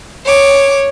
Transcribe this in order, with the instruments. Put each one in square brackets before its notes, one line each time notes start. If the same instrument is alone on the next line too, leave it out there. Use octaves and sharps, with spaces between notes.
[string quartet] C#5 D6